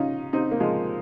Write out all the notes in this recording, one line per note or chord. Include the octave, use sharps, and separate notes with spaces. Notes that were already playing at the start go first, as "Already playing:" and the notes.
Already playing: C#4 D#4 F4
C4 D#4
A#3
F3 G#3